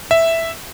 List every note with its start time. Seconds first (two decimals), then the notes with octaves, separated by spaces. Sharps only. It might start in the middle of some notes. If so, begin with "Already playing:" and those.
0.11 E5